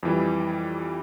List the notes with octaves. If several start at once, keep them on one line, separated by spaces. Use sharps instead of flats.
F2 E3 G3